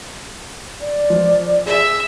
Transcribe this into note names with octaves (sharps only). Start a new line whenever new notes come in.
D5
F3
G#4 E5